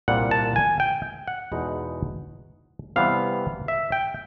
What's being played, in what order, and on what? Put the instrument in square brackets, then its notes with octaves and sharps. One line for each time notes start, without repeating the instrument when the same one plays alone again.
[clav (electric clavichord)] C2 A#2 G3 F#5
A5
G#5
G5
F#5
E2 B2 G#3 B3 D#4
C3 E3 G3 B3 F5
E5
G5